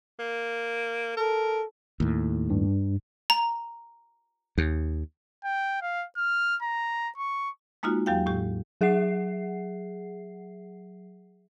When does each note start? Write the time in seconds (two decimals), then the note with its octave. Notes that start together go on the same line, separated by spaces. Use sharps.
0.19 A#3
1.17 A4 A#4
2.00 D#2 A2
2.50 G2
3.30 A#5
4.58 D#2
5.44 G5
5.82 F5
6.17 F6
6.62 A#5
7.17 C#6
7.83 G#3 A#3 D#4 F4 F#4
8.06 E2 F#3 G4 F5 G5
8.26 A2 G4
8.81 F#3 G#4 E5 F#5 C7